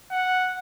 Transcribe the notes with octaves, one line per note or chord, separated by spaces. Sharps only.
F#5